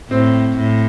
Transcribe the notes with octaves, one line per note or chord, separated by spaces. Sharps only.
A2 C4
A2